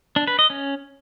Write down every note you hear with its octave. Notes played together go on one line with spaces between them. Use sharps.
D4
B4
D#5
C#4